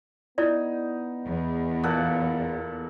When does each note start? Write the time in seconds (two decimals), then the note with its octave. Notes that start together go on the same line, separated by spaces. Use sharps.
0.38 B3 D#4 E4 D5
1.25 E2
1.83 A#2 A4 F#5